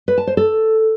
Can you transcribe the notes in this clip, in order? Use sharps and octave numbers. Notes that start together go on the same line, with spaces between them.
B4
A5
C5
A4